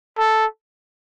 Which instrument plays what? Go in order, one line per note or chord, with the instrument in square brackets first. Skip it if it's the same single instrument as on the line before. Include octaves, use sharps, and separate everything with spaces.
[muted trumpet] A4